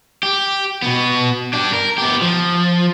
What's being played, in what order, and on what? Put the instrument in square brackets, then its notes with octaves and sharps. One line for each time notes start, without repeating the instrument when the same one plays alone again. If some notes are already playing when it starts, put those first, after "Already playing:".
[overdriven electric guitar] G4
B2 B3
D4 G4
A#4
B3 G4
F3